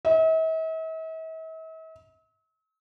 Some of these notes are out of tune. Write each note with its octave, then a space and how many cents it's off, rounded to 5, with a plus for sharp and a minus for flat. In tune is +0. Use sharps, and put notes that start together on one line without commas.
E5 -45